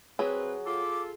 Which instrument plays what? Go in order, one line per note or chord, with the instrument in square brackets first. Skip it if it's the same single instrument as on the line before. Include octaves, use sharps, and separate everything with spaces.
[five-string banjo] F#3 [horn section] C4 B4 [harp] G#4
[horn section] F4 A4 [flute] D6